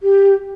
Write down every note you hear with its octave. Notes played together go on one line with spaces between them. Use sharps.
G4